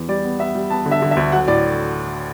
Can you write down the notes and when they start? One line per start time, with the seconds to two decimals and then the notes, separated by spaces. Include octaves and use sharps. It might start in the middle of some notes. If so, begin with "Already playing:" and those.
Already playing: E2
0.08 G3 D5
0.24 B3
0.39 B3 E5
0.55 G3
0.70 B3 A5
0.86 D3
0.91 E5
1.02 D3
1.11 E5
1.17 D2
1.32 F#3 F#5
1.47 A2 D5